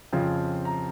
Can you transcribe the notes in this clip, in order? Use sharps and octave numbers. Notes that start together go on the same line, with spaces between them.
F2 C#3 F3 C4
A#5